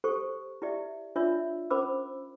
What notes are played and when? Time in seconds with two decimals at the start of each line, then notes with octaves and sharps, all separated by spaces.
0.04 G4 A4 C5 C#6
0.62 E4 G4 D5 E5
1.16 D4 F4 C#5 D5 E5 E6
1.70 C#4 A#4 C5 B5 D6 E6